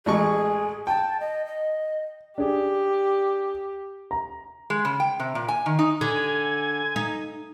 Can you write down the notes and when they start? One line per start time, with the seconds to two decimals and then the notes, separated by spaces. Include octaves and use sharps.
0.06 A1 G#3 G#4 C#6
0.87 G5 A5
1.20 D#5
1.46 D#5
2.38 D4 G4 G#4
4.11 A#5
4.70 G#3
4.85 C#3
5.00 G5
5.20 C3
5.35 A#2
5.48 G#5
5.66 D#3
5.79 D#4
6.01 D3 G#5
6.96 D#4